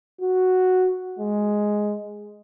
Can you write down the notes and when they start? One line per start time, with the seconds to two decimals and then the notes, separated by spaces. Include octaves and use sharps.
0.21 F#4
1.19 G#3